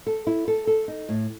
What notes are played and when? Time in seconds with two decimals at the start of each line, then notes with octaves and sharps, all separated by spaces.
0.07 A4
0.27 E4
0.48 A4
0.67 A4
0.88 D#4
1.09 A2